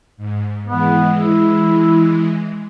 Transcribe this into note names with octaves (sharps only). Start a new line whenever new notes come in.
G#2
E3 G#3 B3
E4